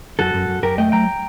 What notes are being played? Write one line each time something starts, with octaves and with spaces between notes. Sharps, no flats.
F#2 F#4 A4
F#2
F#2
F#2 G4 A#4
A3 D#5 G5
F#3 G5 A#5